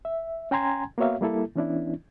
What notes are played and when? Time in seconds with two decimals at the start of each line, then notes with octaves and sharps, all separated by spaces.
0.05 E5
0.51 C#4 G5 G#5 A#5 C6 G#6
0.98 A#3 B3 F#4 C#5 E5 F5
1.21 G3 A#3 E4 A4
1.56 E3 B3 C#4 D4 E4